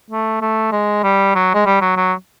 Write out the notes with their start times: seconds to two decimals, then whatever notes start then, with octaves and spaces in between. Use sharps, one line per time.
0.10 A3
0.41 A3
0.72 G#3
1.04 G3
1.35 F#3
1.54 G#3
1.66 G3
1.81 F#3
1.97 F#3